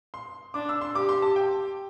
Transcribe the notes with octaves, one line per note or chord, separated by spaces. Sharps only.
C6
D4 D6
E6
C6
G4 D6
C6
A5
G5